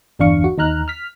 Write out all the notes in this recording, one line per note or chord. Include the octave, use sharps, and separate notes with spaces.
G1 E2 D4 F5 C#6
F#4
D#2 D#4 A#5 F6 F#6
F6 B6